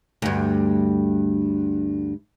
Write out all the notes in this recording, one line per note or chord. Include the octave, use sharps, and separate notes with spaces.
D2 G2